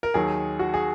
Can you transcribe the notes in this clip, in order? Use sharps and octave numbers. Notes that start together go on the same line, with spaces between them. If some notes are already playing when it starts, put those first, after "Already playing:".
A#4
D#2 D#3 F#3 G#4
F#4
G#4